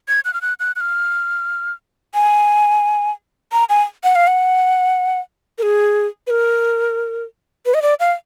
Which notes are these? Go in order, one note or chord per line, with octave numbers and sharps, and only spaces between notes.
G#6
F#6
F6
F#6
F#6
F#6
F6
G#5
A#5
G#5
F#5
F5
F#5
A#4
G#4
B4
A#4
B4
D#5
D5
F5